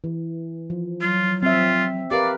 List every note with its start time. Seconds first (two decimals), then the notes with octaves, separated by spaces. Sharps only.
0.04 E3
0.70 F3
1.01 F#3 F4
1.43 C4 F4 E5
2.11 G4 A#4 B4 D5 F5